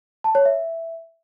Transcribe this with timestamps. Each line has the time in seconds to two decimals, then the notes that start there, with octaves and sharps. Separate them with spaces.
0.24 A5
0.35 C#5
0.46 E5